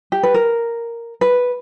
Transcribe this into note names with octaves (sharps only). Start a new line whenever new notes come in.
G4
B4
A#4
B4